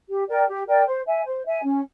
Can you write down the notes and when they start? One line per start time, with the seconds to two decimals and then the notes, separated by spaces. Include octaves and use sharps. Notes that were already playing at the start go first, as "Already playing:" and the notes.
0.08 G4
0.28 A#4 D5 G5
0.48 G4
0.66 A#4 D5 G5
0.86 C5
1.06 E5 G#5
1.25 C5
1.45 E5 G#5
1.64 C#4